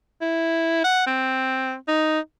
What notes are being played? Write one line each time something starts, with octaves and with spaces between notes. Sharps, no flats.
E4
F#5
C4
D#4